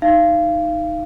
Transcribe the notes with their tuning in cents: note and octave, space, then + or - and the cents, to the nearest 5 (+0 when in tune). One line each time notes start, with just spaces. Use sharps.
D#4 +0 F5 -25